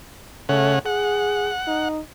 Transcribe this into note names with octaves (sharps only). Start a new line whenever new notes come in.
C#3 A3 F#5
G#4 F#5
D#4